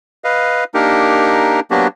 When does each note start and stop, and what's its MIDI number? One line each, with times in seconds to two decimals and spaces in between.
0.24 0.64 71
0.24 0.64 75
0.24 0.64 77
0.74 1.60 58
0.74 1.60 62
0.74 1.60 63
0.74 1.60 67
0.74 1.60 70
1.71 1.87 54
1.71 1.87 58
1.71 1.87 59
1.71 1.87 62
1.71 1.87 66
1.71 1.87 67